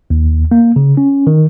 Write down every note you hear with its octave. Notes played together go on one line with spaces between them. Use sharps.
D#2
A#3
C#3
C#4
D#3